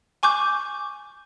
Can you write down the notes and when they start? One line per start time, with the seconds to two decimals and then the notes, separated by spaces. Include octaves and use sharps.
0.23 G#5 C#6 D6 G6